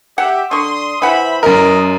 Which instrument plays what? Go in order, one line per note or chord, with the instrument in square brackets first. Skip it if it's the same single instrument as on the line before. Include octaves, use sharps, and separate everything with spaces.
[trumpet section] G4 E5 [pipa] F#5
[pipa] D3 C#6 [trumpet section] C6 D#6
[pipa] E3 F#5 [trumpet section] C5 E5 B5
[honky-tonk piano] F#2 A#4 [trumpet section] D#5